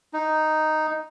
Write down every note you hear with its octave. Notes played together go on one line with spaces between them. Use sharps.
D#4